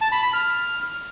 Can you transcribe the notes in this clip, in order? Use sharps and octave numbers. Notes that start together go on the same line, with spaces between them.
A5
B5
B5
F6